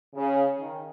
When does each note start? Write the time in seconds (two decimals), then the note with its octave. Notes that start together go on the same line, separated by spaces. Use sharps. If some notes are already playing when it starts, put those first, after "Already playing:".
0.16 C#3
0.61 D#3